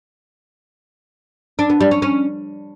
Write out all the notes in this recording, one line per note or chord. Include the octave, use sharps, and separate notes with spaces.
D4
B3
G3
C#4
C#4